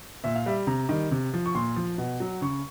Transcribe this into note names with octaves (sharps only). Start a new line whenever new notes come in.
A#2 E5
F5
G3 E5
C3 A#5
D#3 G3
C3
F3
C#6
A#2 C6
F3
B2
F#3
C#3 C#6